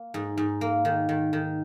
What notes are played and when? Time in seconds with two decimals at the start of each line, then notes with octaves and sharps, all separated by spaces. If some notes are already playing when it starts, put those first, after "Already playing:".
Already playing: A#3
0.14 G#2
0.38 G#2
0.61 A#3
0.85 D#3
1.09 D#3
1.33 D#3